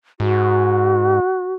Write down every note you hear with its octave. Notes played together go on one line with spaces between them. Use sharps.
G#2 F#4